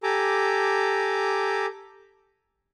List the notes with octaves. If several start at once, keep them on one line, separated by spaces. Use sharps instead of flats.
G4 A4 G#5 A#5 D6